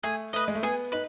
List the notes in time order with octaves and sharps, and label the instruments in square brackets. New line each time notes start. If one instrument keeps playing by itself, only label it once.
[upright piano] A3 [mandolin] G#4
[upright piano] A3 [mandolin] B4 D#5
[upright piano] G#3
A3
[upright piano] B3 [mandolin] G#4
[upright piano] D#4 [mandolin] B4